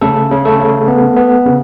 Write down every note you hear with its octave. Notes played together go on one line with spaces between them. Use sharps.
C#3 A3 A4
C#3
A3 A4
C#3
B3
B3
C#3